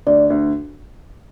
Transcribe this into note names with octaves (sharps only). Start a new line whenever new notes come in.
D2 D5
D2